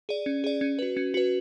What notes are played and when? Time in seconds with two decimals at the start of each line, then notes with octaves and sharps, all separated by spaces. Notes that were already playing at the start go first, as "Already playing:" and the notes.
0.09 G#4 D5
0.26 C#4
0.44 G#4 D5
0.61 C#4
0.79 F#4 B4
0.97 C#4
1.14 F#4 B4